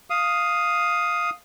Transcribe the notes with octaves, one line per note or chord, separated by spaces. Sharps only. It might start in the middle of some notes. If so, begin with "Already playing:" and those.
F5 D#6